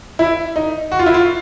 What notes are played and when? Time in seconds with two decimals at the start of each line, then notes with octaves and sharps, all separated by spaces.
0.19 E4
0.56 D#4
0.92 F#4
0.99 F4
1.06 E4
1.14 F4